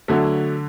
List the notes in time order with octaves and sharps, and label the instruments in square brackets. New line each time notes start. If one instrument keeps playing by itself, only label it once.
[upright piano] D3 [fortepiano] F#3 A3